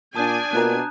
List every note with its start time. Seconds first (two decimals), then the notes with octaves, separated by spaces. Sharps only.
0.16 A#2 D4 G#5 A5 D#6 G6
0.53 B2 A#3 F4 A#4 A#5 F#6